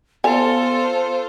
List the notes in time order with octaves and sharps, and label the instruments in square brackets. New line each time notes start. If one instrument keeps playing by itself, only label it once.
[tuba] B3 [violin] F4 C5 [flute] A4 [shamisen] D5 G#5